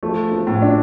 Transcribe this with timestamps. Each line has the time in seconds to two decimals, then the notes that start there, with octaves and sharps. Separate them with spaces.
0.03 F3 A3
0.31 F3
0.47 A2
0.62 D4